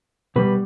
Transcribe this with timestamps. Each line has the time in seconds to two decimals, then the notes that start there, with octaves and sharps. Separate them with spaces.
0.36 B2 G3 B4